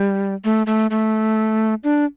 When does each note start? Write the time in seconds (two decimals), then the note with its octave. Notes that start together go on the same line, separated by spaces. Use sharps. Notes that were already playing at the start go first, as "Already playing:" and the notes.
Already playing: G3
0.45 A3
0.67 A3
0.91 A3
1.84 D4